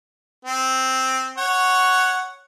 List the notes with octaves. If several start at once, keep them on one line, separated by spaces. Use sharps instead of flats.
C4
C#5 F#5